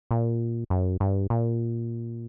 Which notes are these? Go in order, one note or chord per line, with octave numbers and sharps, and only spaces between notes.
A#2
F#2
G2
A#2